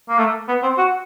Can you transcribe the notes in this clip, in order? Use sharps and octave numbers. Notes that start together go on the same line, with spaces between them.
A#3
A3
B3
C4
F#4